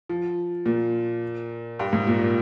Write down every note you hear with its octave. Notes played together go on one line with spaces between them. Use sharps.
F3
A#2
G2
G#2
A#2
A#2